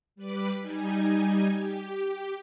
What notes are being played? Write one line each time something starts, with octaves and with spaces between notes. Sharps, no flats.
G3 B4 B5 D6
G3 D#4 G#5
G4